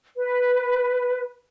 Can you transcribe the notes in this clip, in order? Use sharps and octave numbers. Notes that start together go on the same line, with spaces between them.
B4